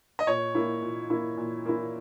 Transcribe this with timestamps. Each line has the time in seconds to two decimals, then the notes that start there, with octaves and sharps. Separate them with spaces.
0.19 D#5
0.27 A#2 C#5
0.55 A#3 E4
0.82 A#2
1.10 A#3 E4
1.38 A#2
1.66 A#3 E4